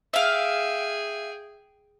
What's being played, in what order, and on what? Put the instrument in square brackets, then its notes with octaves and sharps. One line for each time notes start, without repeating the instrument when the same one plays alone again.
[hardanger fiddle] G#4 G5 [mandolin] E5 F5